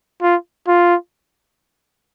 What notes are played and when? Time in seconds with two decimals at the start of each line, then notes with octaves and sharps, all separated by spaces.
0.22 F4
0.68 F4